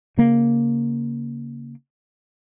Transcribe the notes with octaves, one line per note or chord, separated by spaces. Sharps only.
C#3 A#3